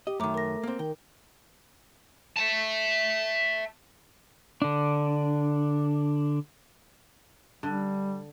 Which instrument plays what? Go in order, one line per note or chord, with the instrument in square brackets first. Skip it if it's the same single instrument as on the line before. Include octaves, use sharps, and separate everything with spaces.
[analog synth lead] G4 [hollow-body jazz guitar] D#5
[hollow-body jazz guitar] F#2 D#3 [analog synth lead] A3 [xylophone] A#5 D6
[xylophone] A#4 A#6
[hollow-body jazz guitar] A#3 C4
[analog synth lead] D#3 [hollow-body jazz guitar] G5
[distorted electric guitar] E5 A5
[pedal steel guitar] D3 D4
[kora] D3 [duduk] G3